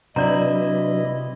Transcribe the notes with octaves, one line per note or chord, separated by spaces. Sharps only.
C3 F#3 D4 E4 B4 D5 D#5 A#5